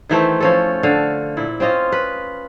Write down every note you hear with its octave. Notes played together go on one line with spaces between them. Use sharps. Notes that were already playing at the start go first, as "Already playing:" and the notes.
D#3 E3 A3 C4
F3 C#4 A4
D3 A4 F5
A#2 E4
C4 C#4 F4 D#5
B4